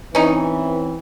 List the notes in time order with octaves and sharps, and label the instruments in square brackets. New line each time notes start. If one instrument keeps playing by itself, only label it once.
[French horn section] E3 C4 [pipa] C#4 D#4